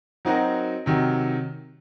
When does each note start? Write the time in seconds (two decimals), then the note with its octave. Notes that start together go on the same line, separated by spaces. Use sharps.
0.25 F#3 C4 D#4 F#4 A#4
0.86 C3 D#3 F#3